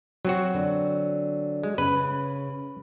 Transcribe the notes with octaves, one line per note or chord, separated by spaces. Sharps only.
F#3 C4 F#4
D3
G#3
C#3 B4